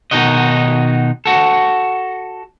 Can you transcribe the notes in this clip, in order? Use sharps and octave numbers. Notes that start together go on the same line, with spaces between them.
B2 D#3 D#4 F#4 D#5
F#4 A4